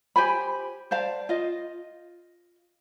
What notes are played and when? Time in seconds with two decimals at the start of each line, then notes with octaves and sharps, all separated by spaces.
0.16 G4 C5 G#5 B5
0.91 C5 D5 F5 A5
1.29 F4 D#5